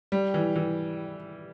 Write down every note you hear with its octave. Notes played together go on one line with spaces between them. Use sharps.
G3
E3
E3